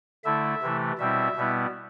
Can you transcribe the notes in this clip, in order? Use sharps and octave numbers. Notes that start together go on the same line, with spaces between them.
D3 A3 E4 E5
C3 E3 A3 E4
B2 G3 C4 E4 E5
B2 G3 B3 E4